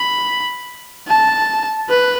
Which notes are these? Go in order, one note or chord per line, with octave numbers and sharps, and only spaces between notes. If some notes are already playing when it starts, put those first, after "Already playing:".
Already playing: B5
A5
B4